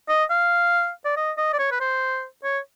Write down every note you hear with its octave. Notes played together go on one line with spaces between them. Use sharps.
D#5
F5
D5
D#5
D#5
D5
C#5
B4
C5
C#5